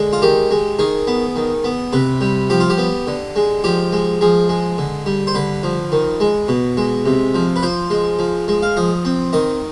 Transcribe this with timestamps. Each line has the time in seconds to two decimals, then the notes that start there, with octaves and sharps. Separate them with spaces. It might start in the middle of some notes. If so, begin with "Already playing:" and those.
Already playing: D3 G#3
0.13 F4
0.22 D#3 G4
0.51 G#3
0.79 D#3 G#4
1.07 B3
1.36 D#3
1.64 B3
1.93 C3 B4
2.21 G3
2.50 F3 G4
2.60 F4
2.70 G4
2.78 B3
3.07 D3
3.36 G#3
3.64 F3 G4
3.93 G#3
4.21 F3 G#4
4.49 G#3
4.78 D3
5.06 G3
5.27 C5
5.35 D3 B4
5.63 F3
5.92 D#3
6.20 G#3
6.48 B2
6.77 G#3
7.06 C3
7.35 F3
7.56 B4
7.63 F3 C5
7.90 G#3
8.19 F3
8.48 G#3
8.63 F5
8.77 F3 D#5
9.05 C4
9.33 D#3 D#5